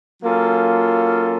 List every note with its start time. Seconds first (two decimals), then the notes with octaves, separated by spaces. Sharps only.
0.23 F#3 A#3 C#4 F4 A4